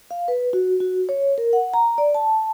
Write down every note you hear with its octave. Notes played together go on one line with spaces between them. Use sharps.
F5
B4
F#4
F#4
C#5
A#4
F#5
A#5
D5
A5